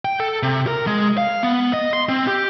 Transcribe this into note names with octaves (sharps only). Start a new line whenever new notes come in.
G5
A4
C3
A#4
G#3
F5
B3
D#5
C6
C4
G4